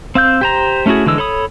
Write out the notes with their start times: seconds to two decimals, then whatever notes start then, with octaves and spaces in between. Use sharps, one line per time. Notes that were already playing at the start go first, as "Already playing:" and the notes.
0.15 C4 F5 E6 G6
0.41 G4 C5 A#5
0.86 A3 C#4 E4 F#4 G#4
1.06 D3 E3 G#3 E6
1.18 A4 C#5 B5 D#6